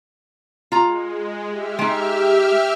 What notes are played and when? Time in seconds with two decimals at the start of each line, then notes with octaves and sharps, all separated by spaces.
0.72 G#3 F4 A#5
1.48 G4 E5 F6
1.79 G#3 D#4